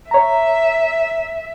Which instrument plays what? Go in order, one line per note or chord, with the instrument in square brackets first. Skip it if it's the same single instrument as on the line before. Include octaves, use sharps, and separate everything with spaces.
[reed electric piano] C#5 A#5 [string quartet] E5